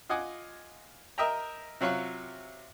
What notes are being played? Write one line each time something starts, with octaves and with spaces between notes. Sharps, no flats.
F4 D#5 F#5 G#5 D6
A#4 D#5 E5 G5 A#5
C3 F#3 F4 C#5 F5 F#6